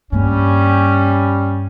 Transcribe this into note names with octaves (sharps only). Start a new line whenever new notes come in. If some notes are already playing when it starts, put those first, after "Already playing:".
G2 G3 A#3 C#4